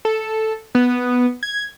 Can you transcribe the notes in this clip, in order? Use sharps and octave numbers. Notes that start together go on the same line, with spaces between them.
A4
B3
G#6